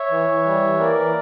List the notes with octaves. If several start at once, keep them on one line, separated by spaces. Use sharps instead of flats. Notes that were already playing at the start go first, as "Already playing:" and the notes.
Already playing: C#5 E5
E3
E3
G3
E3
A#3 A#4 D5
E3